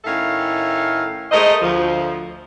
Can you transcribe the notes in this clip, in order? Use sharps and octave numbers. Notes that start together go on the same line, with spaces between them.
A2 D#3 C#4 A4 E5 F5
G#3 A3 A#4 C5 D#5
D2 F3